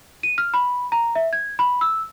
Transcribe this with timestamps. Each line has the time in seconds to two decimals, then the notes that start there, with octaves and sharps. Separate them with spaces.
0.23 D#7
0.38 F6
0.54 B5
0.92 A#5
1.15 E5
1.33 G#6
1.59 B5
1.81 E6